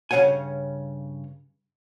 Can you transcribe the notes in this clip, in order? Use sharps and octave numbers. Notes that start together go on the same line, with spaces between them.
G2 C#3 G3 C#5 F#5 G#5